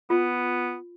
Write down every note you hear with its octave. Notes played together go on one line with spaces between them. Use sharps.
B3 F4